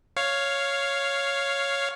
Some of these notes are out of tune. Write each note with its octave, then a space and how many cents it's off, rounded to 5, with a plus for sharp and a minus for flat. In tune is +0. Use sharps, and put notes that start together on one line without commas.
C#5 +0 F5 +0